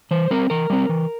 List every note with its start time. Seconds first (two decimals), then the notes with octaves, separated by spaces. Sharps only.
0.11 E3 C5
0.31 G3 C4 A#4
0.50 E3 A#4
0.70 G3 C4
0.89 E3